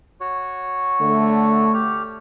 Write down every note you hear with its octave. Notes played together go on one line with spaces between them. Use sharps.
F#4 C#5
D3 A3
G4 F6